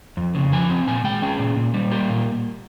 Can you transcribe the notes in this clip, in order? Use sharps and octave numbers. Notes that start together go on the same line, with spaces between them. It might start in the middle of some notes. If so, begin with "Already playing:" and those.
F2
C#3
F3 G#5
C4
A#2 G#5
G#3 G5
C#4 G#4
A#2
A#2
G3
A#3 G4
A#2